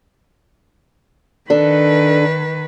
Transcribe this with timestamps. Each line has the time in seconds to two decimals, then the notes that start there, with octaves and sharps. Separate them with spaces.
1.50 D#3 D4 A4 B4